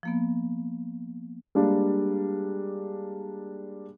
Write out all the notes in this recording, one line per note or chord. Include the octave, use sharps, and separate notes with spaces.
F3 A#3 B3
G3 G#3 A#3 D4